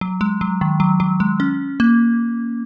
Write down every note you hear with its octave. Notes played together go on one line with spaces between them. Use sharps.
F#3
G#3
F#3
D#3
F#3
F#3
G#3
C#4
A#3